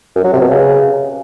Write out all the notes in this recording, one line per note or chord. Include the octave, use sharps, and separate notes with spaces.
F#2
F#3
C3
B2
C#3